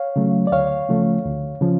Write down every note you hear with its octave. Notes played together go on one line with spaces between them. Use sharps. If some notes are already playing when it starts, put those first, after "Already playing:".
Already playing: C#5 F5
C#3 F#3 A3
D5
D2 C#5 F5
C#3 F3 A3
D2
C#3 F3